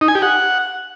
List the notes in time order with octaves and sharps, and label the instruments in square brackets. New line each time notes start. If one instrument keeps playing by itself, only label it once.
[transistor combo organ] D#4
G#5
G4
F#5